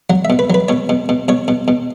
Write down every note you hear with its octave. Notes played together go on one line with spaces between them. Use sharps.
F#3 F#5
E5
B2
B4
F#3 B4
B2 C#5
B2
B2
B2 C#5
B2
B2